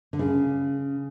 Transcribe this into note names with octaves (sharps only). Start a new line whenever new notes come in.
D3
C#3